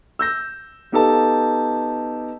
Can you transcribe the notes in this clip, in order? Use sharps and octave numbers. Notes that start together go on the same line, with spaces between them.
E6 G6 A#6
B3 D#4 G4 A4 F5 A5